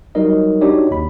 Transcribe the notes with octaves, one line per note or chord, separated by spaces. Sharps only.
F#3 G3 D#4 A#4 D#5
D4 D#4 F#4 G4 C#5 D5
D#2 B5